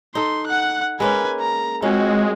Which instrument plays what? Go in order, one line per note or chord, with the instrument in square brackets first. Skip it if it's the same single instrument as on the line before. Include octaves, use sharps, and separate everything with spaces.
[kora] D#4 A4 [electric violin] C6
[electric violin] F#5 F#6
[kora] G#3 A#3 C#4 [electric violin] B4 G#5
[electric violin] A#5
[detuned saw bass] G#3 [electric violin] C4 F#4 [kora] C#4 F4